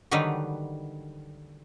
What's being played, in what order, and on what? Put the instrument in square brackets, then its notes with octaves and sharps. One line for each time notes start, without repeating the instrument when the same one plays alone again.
[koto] D3 D#3 F#3 G3 D#4 B4